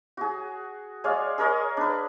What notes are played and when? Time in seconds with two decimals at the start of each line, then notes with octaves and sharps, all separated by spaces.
0.17 F#4 G#4
1.04 G#3 C#5 D5 F5
1.38 G#4 A#4 C#5 D#5
1.77 D4 B4